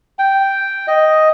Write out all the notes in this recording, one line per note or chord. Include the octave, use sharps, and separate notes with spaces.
G5
D#5